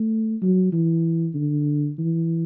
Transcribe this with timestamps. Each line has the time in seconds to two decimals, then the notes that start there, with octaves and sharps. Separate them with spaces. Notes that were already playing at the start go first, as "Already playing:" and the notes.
Already playing: A3
0.42 F#3
0.73 E3
1.35 D3
1.98 E3